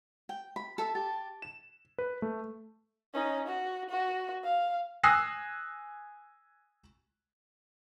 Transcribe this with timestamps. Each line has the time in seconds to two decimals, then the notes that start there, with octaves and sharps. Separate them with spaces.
0.29 G5
0.56 B5
0.78 A4 E5 A5
0.95 G4 A5
1.42 E7
1.98 B4
2.22 A3
3.14 C#4 D#4
3.47 F#4
3.90 F#4
4.44 F5
5.03 G#5 D#6 E6 F#6 A#6 C7